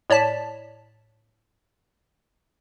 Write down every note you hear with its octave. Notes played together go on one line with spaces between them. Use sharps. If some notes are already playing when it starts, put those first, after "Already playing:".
A2 C#5 D5 A5 B6